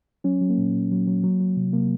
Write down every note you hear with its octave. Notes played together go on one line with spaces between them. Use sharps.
F#3 C#4
F#3
A#3
A#2
A#2
F#3
F#3
F#3
F#3
C3
C3 A#3